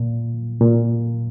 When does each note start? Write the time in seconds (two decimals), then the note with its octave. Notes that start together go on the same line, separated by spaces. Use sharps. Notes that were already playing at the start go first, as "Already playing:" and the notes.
Already playing: A#2
0.60 A#2